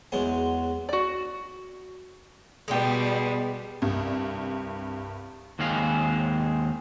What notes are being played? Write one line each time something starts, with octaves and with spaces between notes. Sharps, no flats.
E2 F#3 G#3 C#5 C6
F#4 D5
B2 G3 G#3 B3 D5 G5
C2 G2
D#2 D#3 G#3 C4 F5